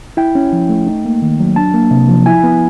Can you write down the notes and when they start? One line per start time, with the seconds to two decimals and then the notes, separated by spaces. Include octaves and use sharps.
0.17 E4 G5
0.35 C#4
0.52 F3
0.69 A3
0.87 D#4
1.05 A#3
1.22 D#3
1.40 F#3
1.56 D4 A5
1.74 A#3
1.91 C3
2.09 F3
2.26 E4 G#5
2.44 B3